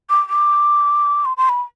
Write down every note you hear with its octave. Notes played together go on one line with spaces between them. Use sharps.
D6
D6
C6
C6
B5